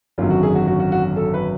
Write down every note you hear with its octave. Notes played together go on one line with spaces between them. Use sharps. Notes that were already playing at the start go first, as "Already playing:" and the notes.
G#1 F#2 D3 F#3 F4
F#4
G#4
F#4
F#4
F#4
F#4
A4
B4